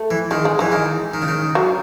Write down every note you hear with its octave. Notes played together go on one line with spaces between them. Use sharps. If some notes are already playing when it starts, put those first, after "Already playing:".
Already playing: A3
E3
D#3 G#3
G#3
E3 G#3
D#3
D#3
C#3
D#3
F#3